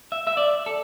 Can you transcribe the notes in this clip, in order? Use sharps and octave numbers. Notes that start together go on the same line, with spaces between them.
E5
E5
D5
A4